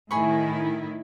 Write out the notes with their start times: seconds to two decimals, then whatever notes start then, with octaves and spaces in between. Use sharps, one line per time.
0.11 A2 D#3 E4 G#4 B5 C#6